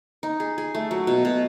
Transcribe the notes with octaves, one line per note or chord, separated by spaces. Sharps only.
D#4
G#4
G#4
A3
F#3
B2
B2